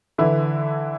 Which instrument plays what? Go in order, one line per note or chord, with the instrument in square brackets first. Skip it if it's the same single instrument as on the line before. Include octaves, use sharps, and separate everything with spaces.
[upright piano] D3 E3 E4